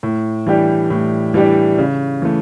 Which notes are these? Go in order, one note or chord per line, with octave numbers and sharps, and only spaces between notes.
A2
E3 G3 D4 G4
A2
E3 G3 D4 G4
C#3
E3 A3